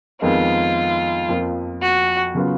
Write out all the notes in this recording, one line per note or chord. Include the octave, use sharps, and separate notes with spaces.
F2 D#3 G#3 B3 D#4 F4
F2 F3 A#3
F#4
C#3 F#3 B3 F4